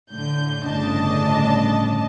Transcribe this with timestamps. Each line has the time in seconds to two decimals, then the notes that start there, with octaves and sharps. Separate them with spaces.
0.11 A2 D3 G6
0.63 G1 A2 C#3 D4 D#5 A5